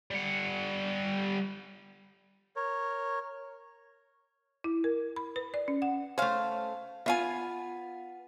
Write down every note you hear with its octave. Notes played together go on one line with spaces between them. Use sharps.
G3 F#5
A#4 C#5
E4
A#4
B5
B4
D5
C#4
F#5
A3 C#4 C5 F5
B3 F4 E5 F5 G#5